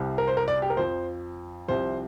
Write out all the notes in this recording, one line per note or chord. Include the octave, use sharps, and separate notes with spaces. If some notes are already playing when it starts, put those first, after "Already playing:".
Already playing: C2 C3 G3
A#4
C5
A#4
D5
G4
A#4
F2 F3 C5
C2 C3 F3 C5